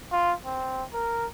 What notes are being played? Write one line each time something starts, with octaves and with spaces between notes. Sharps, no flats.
F4
C4
A#4